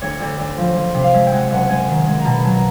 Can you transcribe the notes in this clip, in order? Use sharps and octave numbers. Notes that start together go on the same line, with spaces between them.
D2 C#5
D2 D5
D2 D5
F3
F3
C3
F5
G#3 E5
G5
G#3 F#5
F#1 F#5
G#3 G#5
D#3
G#3
A#5
B2 A5
F#3 A5
A#5